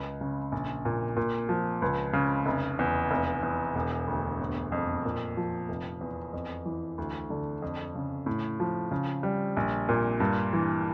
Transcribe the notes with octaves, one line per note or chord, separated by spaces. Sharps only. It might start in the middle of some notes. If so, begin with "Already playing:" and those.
Already playing: C#2
C#3
A#1
A#2
A#2
F3
C#2
C#3
F1
E2
F1
E2
E1
D2
G1
F2
A#2
F3
F1
E2
F2
E3
D2
D3
F2
C#3
A2
F3
C#3
G3
A#1
A#2
G2
E3